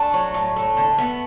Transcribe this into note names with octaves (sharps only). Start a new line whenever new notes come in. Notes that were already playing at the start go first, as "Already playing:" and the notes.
Already playing: A3 D4
F#3
A2
A3
D3
A3 B3